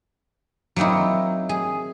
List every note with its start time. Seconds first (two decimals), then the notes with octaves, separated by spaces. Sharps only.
0.76 F#3 A#3 C4 D#4 E4
1.49 G#4